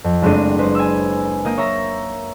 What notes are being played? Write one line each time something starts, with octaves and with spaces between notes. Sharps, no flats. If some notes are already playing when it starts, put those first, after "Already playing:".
F2
F#1 G#3 A3 C4 D4 D#7
G#3 B4 C5
G#5 E6
A#3 D#5 G6
C#5 E5 A#5 A#6